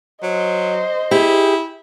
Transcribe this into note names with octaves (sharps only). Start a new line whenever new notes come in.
F#3 C5 D#5
E4 G4 G#4